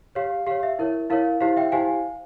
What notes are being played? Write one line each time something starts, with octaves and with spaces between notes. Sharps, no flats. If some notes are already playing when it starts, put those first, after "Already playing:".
G4 C#5 F5
G4 C#5 F5
E5
E4 A#4 C#5
E4 A#4 C#5 F5
E4 G4 C5 F5
E5 G5
E4 G4 C5 F5 G#5